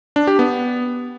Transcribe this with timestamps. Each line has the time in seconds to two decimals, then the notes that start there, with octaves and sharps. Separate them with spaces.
0.16 D4
0.27 G4
0.39 B3